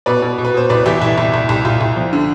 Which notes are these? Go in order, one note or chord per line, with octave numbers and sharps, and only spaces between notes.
B2 B4 D5
B2
B2
B4
B2 C5
C2 B4 D5
E3 E4 G4
C2 E4
C2
C2
C2
C2 F4
C2
F3
D3